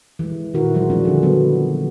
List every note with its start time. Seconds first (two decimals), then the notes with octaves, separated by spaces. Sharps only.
0.19 E3 G#3
0.54 A#2 D#3 E4 F#4 A#4
0.74 E3 F#3 G#3 F#4 C5
0.90 F3 G3 C4 D4 F4
1.04 D3 G#3 G#4 A4
1.22 F#3 B3 D4